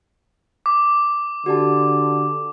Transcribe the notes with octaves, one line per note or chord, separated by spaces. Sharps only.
D6
D3 F#4 G4 A5